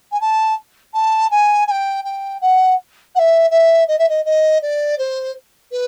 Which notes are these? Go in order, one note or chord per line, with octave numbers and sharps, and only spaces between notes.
G#5
A5
A5
G#5
G#5
G5
G5
F#5
F#5
E5
E5
D#5
E5
D#5
D#5
D5
C5
B4